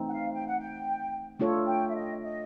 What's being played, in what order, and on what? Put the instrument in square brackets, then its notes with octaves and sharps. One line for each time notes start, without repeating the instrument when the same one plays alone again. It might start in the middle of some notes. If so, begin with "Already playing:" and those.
Already playing: [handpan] E3 A3 C4 D#4
[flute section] F#5
F5
G5
F#5
G5
[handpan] A3 D4 F4 A4 C#5
[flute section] G5
E5
D#5
D#5